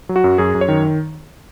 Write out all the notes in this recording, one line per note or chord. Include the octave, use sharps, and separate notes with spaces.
F#3
F#4
F#2
F#2 G#4
F#2
C#5
D#3